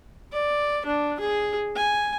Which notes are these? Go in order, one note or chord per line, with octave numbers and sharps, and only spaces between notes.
D5
D4
G#4
G#5